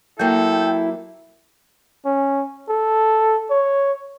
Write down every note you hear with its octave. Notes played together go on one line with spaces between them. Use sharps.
F#3 A#3 E4 A4 G5
C#4
A4
C#5